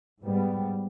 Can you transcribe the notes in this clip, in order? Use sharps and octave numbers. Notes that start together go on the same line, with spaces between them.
G#2 G3 B3